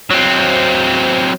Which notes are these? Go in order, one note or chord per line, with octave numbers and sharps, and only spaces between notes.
F#3 C4